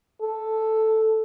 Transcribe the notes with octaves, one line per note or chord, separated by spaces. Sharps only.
A4